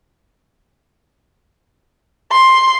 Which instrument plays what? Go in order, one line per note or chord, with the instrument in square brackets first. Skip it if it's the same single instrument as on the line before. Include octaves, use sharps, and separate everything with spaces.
[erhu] C6